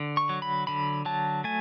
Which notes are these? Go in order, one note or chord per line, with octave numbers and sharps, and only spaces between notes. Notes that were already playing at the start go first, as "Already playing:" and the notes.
Already playing: D3
C#6
F#3
B5
D3 B5
F#3 A5
A3 G#5